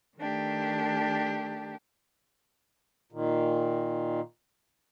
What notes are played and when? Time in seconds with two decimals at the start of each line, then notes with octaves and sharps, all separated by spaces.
0.18 D#3 A3 D4 G4
3.12 A#2 D#3